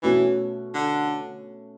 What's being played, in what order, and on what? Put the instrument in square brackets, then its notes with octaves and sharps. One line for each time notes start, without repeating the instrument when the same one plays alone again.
[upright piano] B2 A3 C#4 F#4 [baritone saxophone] E3
[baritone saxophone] D3